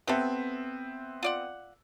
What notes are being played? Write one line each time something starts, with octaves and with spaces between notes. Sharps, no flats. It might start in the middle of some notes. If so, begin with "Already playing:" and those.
B3 C4 G4 A4 E5
F4 D5 F#5